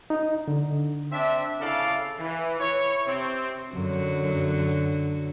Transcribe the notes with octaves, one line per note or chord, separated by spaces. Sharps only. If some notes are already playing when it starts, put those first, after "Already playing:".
D#4
D3
C4 D4 E5
C#3 E4 A4 D5 F5
E3
E4 C#5
C3 C4
F#2 D3 F#3